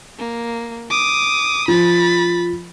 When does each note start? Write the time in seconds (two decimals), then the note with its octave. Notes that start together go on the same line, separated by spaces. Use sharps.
0.19 A#3
0.90 D6 D#6
1.68 F3 B5 A6